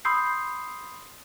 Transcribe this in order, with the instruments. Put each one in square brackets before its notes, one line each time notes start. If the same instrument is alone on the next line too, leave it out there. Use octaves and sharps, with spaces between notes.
[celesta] B5 C6 D#6 E6 G6 C7